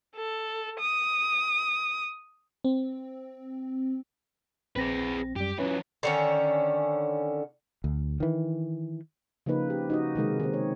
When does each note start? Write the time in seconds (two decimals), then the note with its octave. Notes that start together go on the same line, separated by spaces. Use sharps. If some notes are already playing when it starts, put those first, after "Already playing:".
0.15 A4
0.79 D#6
2.64 C4
4.76 A#1 C4 G#4 B4 A#6
5.36 F#2 G3 G4
5.59 E3 F#3 C#4 B4 C#5
6.03 D3 D#3 C#4
7.84 D2
8.20 D#3 E3
9.46 C#3 F3 A#3 D#4 B4
9.70 G4
9.90 D#4 F#4 D#5
10.15 C3 D#3 G#3 A#4
10.40 D#3 C4
10.53 C#5